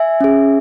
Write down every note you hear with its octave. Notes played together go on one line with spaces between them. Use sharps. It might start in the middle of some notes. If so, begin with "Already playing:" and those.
Already playing: E5 G#5
C#4 G#4